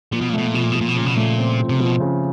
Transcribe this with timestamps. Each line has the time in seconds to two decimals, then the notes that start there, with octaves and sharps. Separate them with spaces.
0.12 A#2 F3
0.21 B2
0.29 A#2
0.33 B2 A3
0.47 A#2
0.54 B2 F3
0.64 A#2
0.72 B2 F3
0.81 A#2
0.89 B2
0.96 A#2 C#3
1.06 B2
1.15 A#2 A3
1.38 C4
1.59 F3
1.69 C3
1.80 B2 F3
2.00 C#3